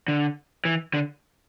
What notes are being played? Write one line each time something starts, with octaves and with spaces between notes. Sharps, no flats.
D3
E3
D3